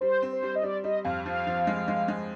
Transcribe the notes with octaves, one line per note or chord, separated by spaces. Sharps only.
G3 C5
C4
C5
G3
D#5
G3 D5
G3 D#5
F2 F5
F3 F5
F3
G#3
G#3
G#3